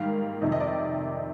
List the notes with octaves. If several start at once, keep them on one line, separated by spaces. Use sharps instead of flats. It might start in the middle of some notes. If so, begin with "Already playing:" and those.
Already playing: G#2 D#3 G3 A#3 F5
F2 C3 D#3 D#5
D#5
D5